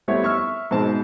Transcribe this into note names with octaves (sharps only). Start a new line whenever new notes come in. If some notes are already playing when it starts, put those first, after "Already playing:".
G3 A3 B3 C4 E4 C#5
E5 C#6 E6 F6
G#2 B2 C4 A5